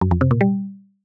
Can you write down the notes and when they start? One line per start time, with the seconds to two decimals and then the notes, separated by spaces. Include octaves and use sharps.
0.01 F#2
0.11 F2
0.21 C3
0.31 A#2
0.41 G3